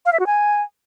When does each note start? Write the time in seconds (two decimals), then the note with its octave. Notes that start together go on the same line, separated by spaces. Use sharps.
0.06 F5
0.12 E5
0.19 F#4
0.26 G#5